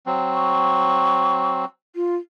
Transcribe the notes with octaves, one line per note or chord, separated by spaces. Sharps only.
F#3 C4
C#6
F4